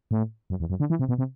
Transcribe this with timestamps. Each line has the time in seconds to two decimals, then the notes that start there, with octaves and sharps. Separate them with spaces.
0.11 A2
0.50 F#2
0.60 E2
0.70 F#2
0.80 D3
0.90 E3
0.99 C3
1.09 B2
1.18 C3